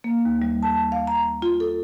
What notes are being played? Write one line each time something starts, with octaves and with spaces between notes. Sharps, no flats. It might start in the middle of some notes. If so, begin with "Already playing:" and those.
A#3
D#2
G3
A5
F5
A#5
F4
A4